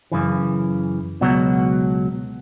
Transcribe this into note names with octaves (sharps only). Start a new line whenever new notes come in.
F#2 C#3 E3
C#2 B2 F#3